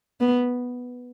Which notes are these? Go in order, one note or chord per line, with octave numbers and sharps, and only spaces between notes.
B3